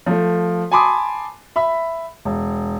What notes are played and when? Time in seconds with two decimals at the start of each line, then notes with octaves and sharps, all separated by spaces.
0.06 F3 A3
0.72 G#5 A5 B5 C6 D6 D#6
1.56 E5 B5
2.25 E1